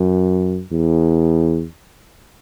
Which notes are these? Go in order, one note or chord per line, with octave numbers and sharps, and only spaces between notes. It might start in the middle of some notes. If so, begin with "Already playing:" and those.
Already playing: F#2
E2